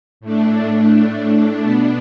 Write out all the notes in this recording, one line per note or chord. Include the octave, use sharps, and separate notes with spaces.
A2 A3 D4
B2 B3 D4